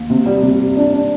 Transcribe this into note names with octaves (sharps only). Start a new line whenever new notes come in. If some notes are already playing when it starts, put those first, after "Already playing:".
Already playing: D#2
C3
G3
C3
G3
D4
D4